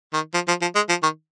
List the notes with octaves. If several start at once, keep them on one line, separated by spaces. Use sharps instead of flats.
D#3
F3
F3
F3
G#3
F3
D#3